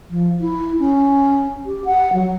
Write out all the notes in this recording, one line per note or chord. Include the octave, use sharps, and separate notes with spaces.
F3
E4
C#4
G4
F#5
F#3